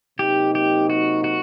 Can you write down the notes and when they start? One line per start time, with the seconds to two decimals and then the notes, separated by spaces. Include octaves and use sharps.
0.19 C3 F#3 A#3 D#4 G4
0.55 G4
0.90 F#4
1.24 F#4